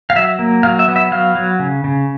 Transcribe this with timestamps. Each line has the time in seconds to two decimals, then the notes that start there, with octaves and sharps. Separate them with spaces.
0.10 F5
0.16 F#3 E5
0.39 A#3
0.63 F#3 F5
0.79 E5
0.88 B3
0.96 E5
1.12 F#3 F5
1.35 F#3
1.59 C#3
1.84 C#3